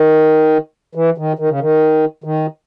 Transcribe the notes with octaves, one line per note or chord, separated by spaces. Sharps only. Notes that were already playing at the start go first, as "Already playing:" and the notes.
Already playing: D#3
E3
D#3
D#3
C#3
D#3
D#3